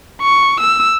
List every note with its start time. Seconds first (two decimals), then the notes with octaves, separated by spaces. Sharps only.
0.22 C#6
0.61 E6